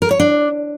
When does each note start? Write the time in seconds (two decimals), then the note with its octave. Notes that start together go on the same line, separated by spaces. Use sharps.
0.02 A#4
0.11 C#5
0.20 D4